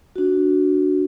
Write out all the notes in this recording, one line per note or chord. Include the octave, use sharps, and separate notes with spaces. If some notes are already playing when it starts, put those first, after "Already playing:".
D4 F#4